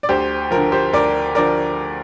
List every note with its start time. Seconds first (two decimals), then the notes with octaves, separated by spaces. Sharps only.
0.03 D5
0.09 D2 G4 C5
0.51 D3 F3 A#4
0.72 G4 C5
0.93 D2 A#4 D5
1.35 D3 F3 A#4 D5